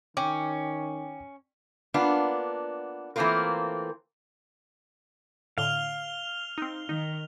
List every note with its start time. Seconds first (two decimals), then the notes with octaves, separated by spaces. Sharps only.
0.17 D#3 C#4 G5 D6
1.94 A#3 B3 D4 F4
3.16 E3 A3 A#3 C4 F4 A#4
5.58 A2 D3 F5 F6 F7 G7
6.58 C4 D#4
6.89 D#3 D#4